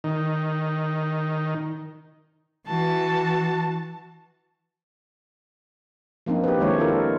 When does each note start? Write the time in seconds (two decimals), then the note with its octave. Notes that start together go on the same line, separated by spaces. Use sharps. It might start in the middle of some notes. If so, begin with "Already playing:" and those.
0.04 D#3
2.67 E3 F#4 A5
6.26 F3 A#3 C4 D4 D#4
6.44 G4 B4
6.59 D#3 G#3 A#3 D4 E4 C#5
6.79 F4 A4 A#4